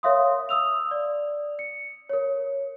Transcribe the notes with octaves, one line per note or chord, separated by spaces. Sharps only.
A#4 C#5 E5 F5 C6 D#6
D#6 E6 F7
D5
C#7
A#4 C#5